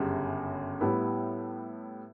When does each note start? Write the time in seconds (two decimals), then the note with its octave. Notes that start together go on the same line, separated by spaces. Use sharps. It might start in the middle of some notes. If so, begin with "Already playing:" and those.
Already playing: G1 F#2 C#3 G3
0.81 A2 G3 B3 E4